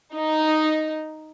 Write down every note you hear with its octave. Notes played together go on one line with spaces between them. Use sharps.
D#4